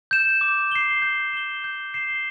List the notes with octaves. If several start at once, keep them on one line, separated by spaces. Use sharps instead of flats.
G6 E7
D6
C7 G7
G6
E7 G7
G6
C7 E7 G7